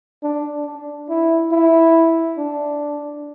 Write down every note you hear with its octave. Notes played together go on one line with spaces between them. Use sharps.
D4
D4
E4
E4
D4